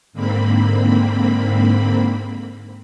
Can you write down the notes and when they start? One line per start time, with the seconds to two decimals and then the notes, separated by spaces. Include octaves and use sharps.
0.13 G#2 D3 A#3 C4 B5